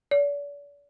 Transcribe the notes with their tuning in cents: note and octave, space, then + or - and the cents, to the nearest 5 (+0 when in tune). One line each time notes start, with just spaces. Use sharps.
D5 -40